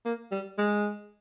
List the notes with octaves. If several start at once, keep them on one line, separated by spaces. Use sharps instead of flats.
A#3
G3
G#3